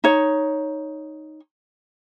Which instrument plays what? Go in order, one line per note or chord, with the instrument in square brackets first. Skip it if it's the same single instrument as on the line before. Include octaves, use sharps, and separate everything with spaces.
[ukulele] D#4 C#5